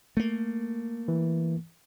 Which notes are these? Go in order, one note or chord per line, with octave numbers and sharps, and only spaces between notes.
A3 A#3
E3